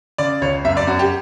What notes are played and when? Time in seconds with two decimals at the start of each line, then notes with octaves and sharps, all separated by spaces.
0.18 C#3 D5
0.42 C#2 C#5
0.65 F#2 E5
0.77 D5
0.87 F#2 F#4
0.99 G4